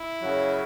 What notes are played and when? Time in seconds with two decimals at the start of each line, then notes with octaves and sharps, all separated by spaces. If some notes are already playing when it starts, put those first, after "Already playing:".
Already playing: E4
0.21 F#2 C#3 F#3